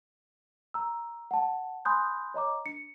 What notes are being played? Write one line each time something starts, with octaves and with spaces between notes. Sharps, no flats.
A#5 E6
F#5 A5
G#5 B5 C6 D#6 F#6 G6
C#5 D#5 A#5 D6
D4 C#7